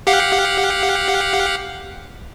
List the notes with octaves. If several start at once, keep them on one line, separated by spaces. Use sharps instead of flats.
G4 F5 F#5